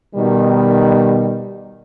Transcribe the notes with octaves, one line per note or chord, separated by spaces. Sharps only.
B2 D#3 G3